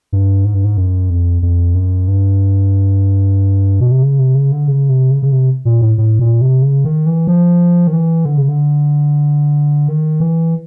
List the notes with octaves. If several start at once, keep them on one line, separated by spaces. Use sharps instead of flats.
G2
G#2
G2
G#2
F#2
F2
F2
F#2
G2
B2
C3
C#3
C3
C#3
D3
C#3
C3
C#3
C#3
C3
A#2
A2
A2
A#2
C3
C#3
D#3
E3
F3
D#3
E3
D3
C#3
D3
D#3
E3